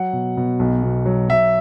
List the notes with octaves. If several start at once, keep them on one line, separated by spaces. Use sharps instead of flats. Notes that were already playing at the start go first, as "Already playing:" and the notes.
Already playing: F#3 F#5
B2
B2
B1
B2
F#3
F#3 E5